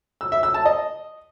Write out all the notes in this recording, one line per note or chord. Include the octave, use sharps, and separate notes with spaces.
E6
E5
E6
A5
D#5